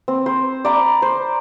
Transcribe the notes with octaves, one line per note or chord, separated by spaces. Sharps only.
C4
C5
D5 A#5 B5 D6
C5